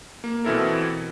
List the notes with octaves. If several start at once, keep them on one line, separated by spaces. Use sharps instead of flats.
A#3
B2 E3 C4 E4 A4 A#4